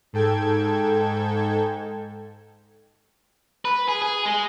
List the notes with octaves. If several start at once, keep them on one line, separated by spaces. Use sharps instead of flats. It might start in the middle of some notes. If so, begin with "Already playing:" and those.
G#2 A4 G5 G#6
B4
G#4
G#4
G#3